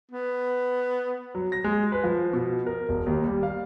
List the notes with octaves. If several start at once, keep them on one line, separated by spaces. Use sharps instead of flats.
B3
F#3
A#6
G#3
B4
F3
B2
A#4
E1
D#2
G3
F5